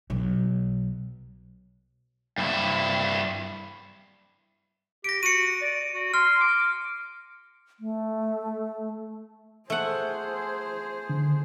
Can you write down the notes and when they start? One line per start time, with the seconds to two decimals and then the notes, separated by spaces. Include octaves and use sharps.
0.10 B1
2.38 G2 E4
5.04 G4 A#6 D7
5.23 F#4 C#7 D#7
5.61 D5
5.94 F#4
6.14 C6 F6
6.41 D6
7.80 A3
9.70 A3 G#4 C5 F#5
11.09 D3